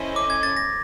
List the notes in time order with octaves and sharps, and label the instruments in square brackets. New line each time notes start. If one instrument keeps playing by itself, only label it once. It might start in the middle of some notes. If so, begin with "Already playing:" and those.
Already playing: [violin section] C#4 E4 A4 C5 D#5
[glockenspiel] D6
G#6
A6
A#6